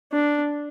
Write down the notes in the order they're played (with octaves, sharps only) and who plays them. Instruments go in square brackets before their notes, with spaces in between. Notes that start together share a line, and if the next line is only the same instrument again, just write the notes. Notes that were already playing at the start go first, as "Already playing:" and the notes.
[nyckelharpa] D4